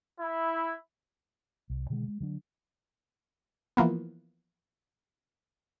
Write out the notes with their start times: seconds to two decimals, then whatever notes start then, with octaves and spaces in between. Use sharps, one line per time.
0.20 E4
1.70 C2
1.90 B2 D3 D#3 G#3
2.08 G#3
2.20 D3 F#3 D4
3.77 E3 F3 A#3 B3